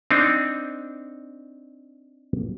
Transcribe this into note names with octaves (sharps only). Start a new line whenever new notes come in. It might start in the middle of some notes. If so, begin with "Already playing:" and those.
C4 D4 D#4